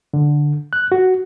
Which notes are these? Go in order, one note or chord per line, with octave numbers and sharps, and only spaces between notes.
D3
F#6
F#4